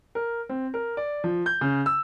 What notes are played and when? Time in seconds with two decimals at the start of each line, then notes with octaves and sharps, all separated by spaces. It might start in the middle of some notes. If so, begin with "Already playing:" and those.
0.15 A#4
0.49 C4
0.74 A#4
0.97 D5
1.24 F3
1.46 G6
1.61 C#3
1.86 E6